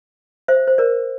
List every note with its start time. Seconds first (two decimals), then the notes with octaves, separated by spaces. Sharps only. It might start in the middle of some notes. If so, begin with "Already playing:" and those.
0.48 C5 E5
0.67 C5
0.78 A#4 D5